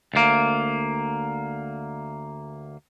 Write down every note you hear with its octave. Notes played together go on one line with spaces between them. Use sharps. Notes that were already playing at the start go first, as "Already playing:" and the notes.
D2 A#3